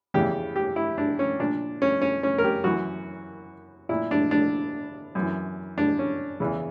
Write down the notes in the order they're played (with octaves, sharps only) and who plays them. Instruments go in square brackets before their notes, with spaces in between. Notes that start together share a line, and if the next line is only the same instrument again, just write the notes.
[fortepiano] E2 C#3 E3 G4
G4
E4
D4
C#4
A#2 D4
C#4
C#4
C#4
A#4
G4
F#2 E3 F#4
A#2 E4
D4
D4
F#2 E3
D4
C#4
E2 C#3 E3